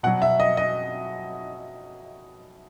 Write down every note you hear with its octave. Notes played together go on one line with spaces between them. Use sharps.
B2 F#3 F#5
E5
D#5
D#5